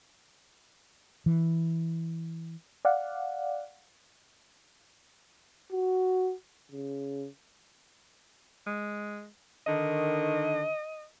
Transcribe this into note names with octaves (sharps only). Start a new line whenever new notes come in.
E3
D5 F5 F#5
F#4
C#3
G#3
D3 D#3 D#5